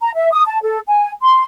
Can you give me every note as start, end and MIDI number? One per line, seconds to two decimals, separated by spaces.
0.01 0.10 82
0.16 0.30 76
0.32 0.42 87
0.45 0.60 81
0.62 0.79 69
0.87 1.11 80
1.22 1.45 84